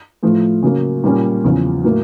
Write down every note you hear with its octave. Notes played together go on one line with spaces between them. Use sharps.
A2 F3 A3
C#3 F#3 A#3
A#2 G3 A#3 C#4
E2 C#3 F3
A2 F#3 A#3